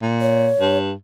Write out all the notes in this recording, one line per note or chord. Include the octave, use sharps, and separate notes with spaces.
A#2
C#5
G2